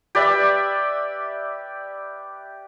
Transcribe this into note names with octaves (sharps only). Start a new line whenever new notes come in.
G4 B4 D5 E5